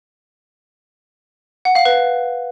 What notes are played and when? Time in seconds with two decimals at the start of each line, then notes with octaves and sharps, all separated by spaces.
1.65 F#5
1.75 F5
1.85 B4